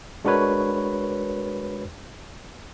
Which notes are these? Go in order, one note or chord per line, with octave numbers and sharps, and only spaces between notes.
G#3 D4 F#4 A#4 B4 C#5